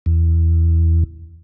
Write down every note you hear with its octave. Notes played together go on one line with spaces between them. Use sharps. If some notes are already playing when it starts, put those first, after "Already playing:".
E2